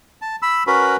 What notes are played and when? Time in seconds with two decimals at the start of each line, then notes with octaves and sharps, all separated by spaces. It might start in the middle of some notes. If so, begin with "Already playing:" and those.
0.22 A5
0.42 B5 E6
0.67 C#4 F#4 A#4 B4 B5